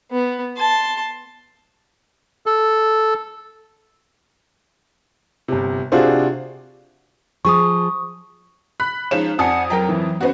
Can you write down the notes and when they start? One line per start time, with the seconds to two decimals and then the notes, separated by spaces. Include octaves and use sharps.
0.12 B3
0.57 A5 C6
2.46 A4
5.48 G1 C3
5.92 C3 D4 F4 F#4 G#4 C5
7.45 F3 G#4 C#6 D#6
8.80 B5 F#6 B6
9.11 F3 G#3 C#4 D#4 E7
9.39 F2 D5 F#5 G#5 A5 D#6
9.70 F#3 A#4 G5 A#5
9.89 E3
10.21 B3 C#4 F#4 B4 C5